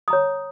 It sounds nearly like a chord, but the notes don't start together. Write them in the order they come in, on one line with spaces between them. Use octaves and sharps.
D#6 A#5 C#5